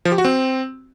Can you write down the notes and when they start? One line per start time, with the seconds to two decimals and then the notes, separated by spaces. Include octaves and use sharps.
0.05 F3
0.12 G4
0.18 F#4
0.25 C4